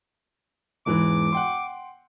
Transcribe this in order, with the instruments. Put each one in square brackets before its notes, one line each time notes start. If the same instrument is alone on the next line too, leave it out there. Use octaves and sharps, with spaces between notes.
[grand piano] E1 G#2 E3 [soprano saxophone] D6
[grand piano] F#5 G5 C6